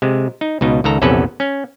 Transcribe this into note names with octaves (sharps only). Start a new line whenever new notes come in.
C3 G#3
D#4
C#2 B2 D#4
C#2 D#3 A4 A#5
A#1 E2 C3 C#4 A4 B4
C#4